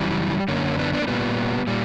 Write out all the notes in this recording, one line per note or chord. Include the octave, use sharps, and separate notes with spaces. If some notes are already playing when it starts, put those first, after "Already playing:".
Already playing: F#2 C#3 E3 G3
F#2 D3 A#3 C#4
B3 D4
B3 D4
A#3
A#2 G3 B3
A#2 G3